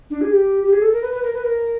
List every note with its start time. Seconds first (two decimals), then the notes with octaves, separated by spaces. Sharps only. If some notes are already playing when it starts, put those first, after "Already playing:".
0.10 D4
0.21 G#4
0.31 G4
0.64 G4
0.72 G#4
0.82 A4
0.93 A#4
1.02 B4
1.13 B4
1.23 A#4
1.34 B4
1.43 A#4